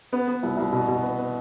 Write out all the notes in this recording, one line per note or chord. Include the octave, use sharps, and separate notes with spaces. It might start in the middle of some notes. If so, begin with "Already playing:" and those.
B3
B3
C2
C2
B2
B2
B3
B3